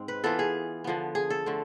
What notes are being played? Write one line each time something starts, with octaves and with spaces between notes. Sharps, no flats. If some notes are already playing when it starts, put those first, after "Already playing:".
Already playing: G#2 G#3 C4
B4
E3 B3 F4 A4
G#4
D3 F3 B3
G#4
A4
D3 A3 C4